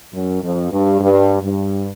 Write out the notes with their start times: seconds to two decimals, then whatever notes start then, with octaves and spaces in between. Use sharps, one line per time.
0.14 F#2
0.43 F2
0.71 G2
1.01 G2
1.43 G2